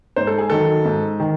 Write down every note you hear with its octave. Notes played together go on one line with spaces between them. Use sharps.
G#2 C5
A4
G#4
D#3 F#3 A4
G#2
D#3